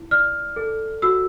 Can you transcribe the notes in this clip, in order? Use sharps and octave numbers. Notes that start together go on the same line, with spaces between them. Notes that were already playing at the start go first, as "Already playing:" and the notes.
Already playing: E4
D5 F6
A4
F#4 E6